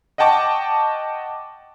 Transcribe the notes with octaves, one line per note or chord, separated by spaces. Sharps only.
D#5 F#5 G5 A5 C#6 D6